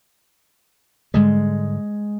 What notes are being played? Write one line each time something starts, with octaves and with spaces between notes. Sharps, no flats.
G#2 D3 G3 G#3